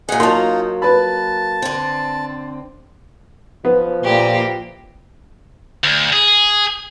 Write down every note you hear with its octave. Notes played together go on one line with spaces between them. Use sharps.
A#2 G#3 G#4 F#5
F#3 A#3 D#4 F4 A5 C6
B4 A5 B5
D3 C4
F3 B3
A#2 A#3 E4 G4
D2
G#4